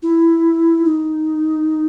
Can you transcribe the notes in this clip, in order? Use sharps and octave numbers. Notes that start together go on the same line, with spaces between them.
E4
D#4